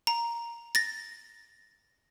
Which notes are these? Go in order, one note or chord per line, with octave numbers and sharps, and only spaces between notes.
A#5
A6 A#6